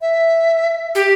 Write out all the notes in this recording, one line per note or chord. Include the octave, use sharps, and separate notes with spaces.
E5
G4